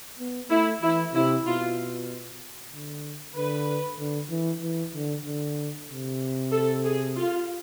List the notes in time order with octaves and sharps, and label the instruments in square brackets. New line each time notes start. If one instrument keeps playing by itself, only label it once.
[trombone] B3
[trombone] A3 [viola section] E4
[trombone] E3 [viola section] E4
[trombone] C3 [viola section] E4
[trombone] B2 [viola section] F4
[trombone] D3
[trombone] D3 [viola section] B4
[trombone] D3
E3
E3
D3
D3
C3
[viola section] A4
G#4
F4